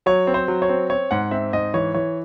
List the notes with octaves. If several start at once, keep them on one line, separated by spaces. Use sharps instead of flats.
F#3 C#5
C4
C5
F#3
C#5
C4
C4 C#5
G#2 F#5
C4 E5
G#2 D#5
E3 C#5
E3 C#5